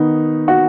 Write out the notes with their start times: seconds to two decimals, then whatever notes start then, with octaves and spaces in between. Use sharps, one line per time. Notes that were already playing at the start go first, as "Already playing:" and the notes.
Already playing: D#3 B3 D#4
0.48 F#4